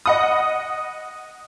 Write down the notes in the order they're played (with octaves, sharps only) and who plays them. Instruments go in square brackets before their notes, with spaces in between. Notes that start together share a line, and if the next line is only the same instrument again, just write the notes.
[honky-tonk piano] D#5 F#5 D#6